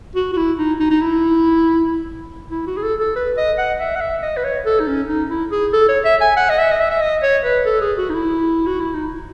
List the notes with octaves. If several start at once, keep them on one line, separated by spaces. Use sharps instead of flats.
F#4
F#4
E4
D#4
D#4
D#4
E4
E4
F#4
G#4
A4
A4
B4
D#5
F#5
E5
F#5
E5
D#5
B4
C#5
A4
D#4
C#4
D#4
E4
G#4
A4
C#5
E5
G#5
F#5
D#5
E5
D#5
E5
E5
D#5
C#5
B4
A4
G#4
F#4
D#4
E4
F#4
E4
D#4